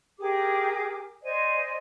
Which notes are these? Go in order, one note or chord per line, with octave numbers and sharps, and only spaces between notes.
G4 G#4 A#4 D6
C5 D5 D#5 G#5